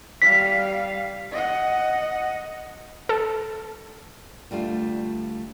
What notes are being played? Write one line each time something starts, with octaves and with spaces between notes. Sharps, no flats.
G3 F5 B6
D#5 F#5
A4
D2 G3 A3 F4